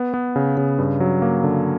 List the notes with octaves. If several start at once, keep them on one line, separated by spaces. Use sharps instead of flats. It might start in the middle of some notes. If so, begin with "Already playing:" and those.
Already playing: B3
B3
C#3
C#3
G2
F#3
A#3
D3